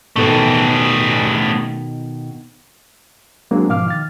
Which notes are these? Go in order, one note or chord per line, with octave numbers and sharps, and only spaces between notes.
B2 D#3 A3 B3 A4
F#3 G#3 A#3 C4 D4
G#2 B2 F3 F5 D6 F6
D#3 F6 A6